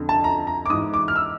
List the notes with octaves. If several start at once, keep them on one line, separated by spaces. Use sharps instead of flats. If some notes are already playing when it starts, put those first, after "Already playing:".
Already playing: F2 D3
A5
A#5
A#5
D6
G#2 E3 D#6
D6
F6
E6